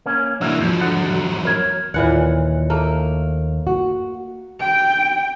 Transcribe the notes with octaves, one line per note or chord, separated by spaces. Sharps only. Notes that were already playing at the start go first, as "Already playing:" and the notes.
A#3 C#4
E3 A#3 D4 E4 F#4
E2 F3 F#3
D3 F3 F#5
A#4 C#5
D#2 A#2 E3 F#5
A3 A#3
F#4
G5